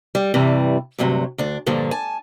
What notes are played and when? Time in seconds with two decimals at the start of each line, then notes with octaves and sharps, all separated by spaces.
0.15 G3
0.34 G2 C3 E3 G3
0.98 D2 G2 C3 F#3
1.38 D2 D4
1.66 G2 A#2 D3 F3
1.91 G#5 A5